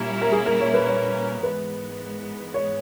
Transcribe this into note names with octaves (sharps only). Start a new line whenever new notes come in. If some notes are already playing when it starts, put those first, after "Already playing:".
Already playing: A#2 G3 A#3 C#4 E4 G4
A#4
G#4
A#4
C#5
B4
C#5
G#2 E3 G#3 B3 B4
C#5